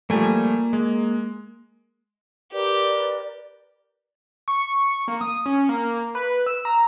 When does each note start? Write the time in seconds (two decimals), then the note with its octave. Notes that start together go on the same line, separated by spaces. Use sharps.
0.10 F3 G3 A3 A#3 G#5
0.73 G#3
2.52 G4 A#4 B4 D5
4.48 C#6
5.08 A#3
5.21 D#6
5.46 C#4
5.69 A#3
6.15 B4
6.47 E6
6.65 A#5